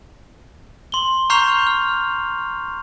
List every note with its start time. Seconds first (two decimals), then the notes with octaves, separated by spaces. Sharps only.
0.92 C6 G7
1.30 A#5 C#6 F6 G6 C7 F7
1.67 F6